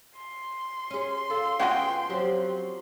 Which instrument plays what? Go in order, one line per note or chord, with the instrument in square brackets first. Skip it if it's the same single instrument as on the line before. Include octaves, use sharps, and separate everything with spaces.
[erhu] C6
[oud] C#4 G#4
[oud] F4 [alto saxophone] A4
[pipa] C#3 F#4 G#4 [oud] B3 F4 [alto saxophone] G5
[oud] F3 C4 G4 [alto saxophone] F#3